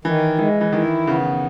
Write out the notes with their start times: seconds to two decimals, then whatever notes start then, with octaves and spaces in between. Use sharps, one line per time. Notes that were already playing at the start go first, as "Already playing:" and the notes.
0.05 D#3 E3
0.39 E3 G#3
0.61 E3
0.73 D#3 E4
1.07 C#3 B3